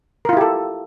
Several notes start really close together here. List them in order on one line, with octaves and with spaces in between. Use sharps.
A#4 F4 E4 G4 A4